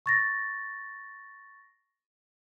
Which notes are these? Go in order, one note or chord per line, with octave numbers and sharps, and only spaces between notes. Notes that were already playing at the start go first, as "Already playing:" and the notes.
C#6 A6 A#6